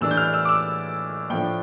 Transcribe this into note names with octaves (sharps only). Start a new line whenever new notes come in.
A2 E3 G3 D4 E6
G6
F6
E6
D6
E6
A2 F3 A3 D4 G5